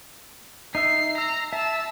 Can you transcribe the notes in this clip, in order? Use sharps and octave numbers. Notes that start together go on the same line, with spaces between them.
D#4 E5 E6 C7
A#5 E6
E5 A5 E6